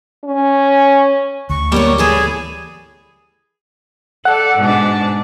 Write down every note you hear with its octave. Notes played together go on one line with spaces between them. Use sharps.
C#4
D2 C#6
G3 A#3 B3 C#5
E3 G#4 A4 B4
A4 D5 F#5
G#2 B2 D4